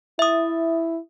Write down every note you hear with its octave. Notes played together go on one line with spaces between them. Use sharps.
E4 E5 D#6